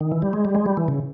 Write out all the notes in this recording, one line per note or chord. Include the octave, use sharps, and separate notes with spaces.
D#3
E3
G3
G#3
G3
G#3
G3
E3
C#3